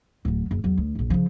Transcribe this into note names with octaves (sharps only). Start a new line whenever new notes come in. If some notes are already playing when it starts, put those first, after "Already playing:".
D1 F#3
F#1
E2 F#3
D2
A#1 F#2
C#3 F3